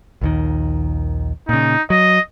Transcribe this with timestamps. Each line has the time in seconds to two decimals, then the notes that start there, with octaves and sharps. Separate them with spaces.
0.21 A#1 D#2 D#3
1.49 A#2 C#3 D#4
1.90 F#3 D#5